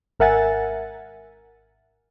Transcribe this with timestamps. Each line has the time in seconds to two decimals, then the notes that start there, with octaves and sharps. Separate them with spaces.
0.20 G#1 A#4 E5 F#5 G#5 A6